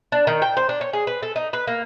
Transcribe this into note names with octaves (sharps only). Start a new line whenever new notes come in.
D4
D#3
G5
C5
D4
C#5
G#4
B4
A4
D#4
B4
A#3